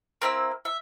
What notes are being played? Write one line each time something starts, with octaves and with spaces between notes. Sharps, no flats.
A#3 C4 E4 E6
E5